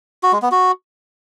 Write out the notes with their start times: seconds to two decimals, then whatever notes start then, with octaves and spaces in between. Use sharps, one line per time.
0.23 F#4
0.33 G#3
0.42 B3
0.52 F#4